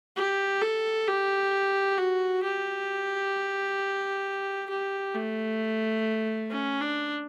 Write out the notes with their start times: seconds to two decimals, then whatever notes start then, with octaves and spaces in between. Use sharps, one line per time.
0.17 G4
0.62 A4
1.08 G4
1.98 F#4
2.43 G4
4.70 G4
5.14 A3
6.51 C#4
6.81 D4